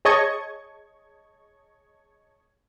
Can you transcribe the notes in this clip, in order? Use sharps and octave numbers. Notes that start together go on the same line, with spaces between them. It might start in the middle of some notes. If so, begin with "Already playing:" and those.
G#4 C#5 D#5 A5 C#6 G#6